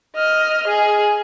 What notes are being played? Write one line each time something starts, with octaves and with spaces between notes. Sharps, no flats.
D#5 F6
G#4